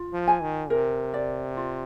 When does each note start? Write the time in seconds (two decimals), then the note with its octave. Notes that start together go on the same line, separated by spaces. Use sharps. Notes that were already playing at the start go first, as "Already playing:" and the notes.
Already playing: F4
0.13 F3
0.28 G#5
0.42 D#3
0.70 C3 A#4
1.14 D5
1.57 F4